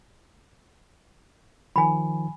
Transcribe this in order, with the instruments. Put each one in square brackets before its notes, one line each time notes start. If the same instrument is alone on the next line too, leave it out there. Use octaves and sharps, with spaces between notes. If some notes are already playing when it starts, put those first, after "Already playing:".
[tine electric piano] D#3 F3 [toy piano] G#5 B5